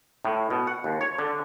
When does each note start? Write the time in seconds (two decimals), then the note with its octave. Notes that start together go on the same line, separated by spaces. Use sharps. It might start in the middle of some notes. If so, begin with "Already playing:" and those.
0.25 A2
0.50 B2
0.67 F#5
0.84 D#2
1.01 C#5
1.18 D3